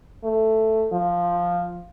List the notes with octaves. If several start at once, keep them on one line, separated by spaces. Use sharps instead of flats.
A3
F3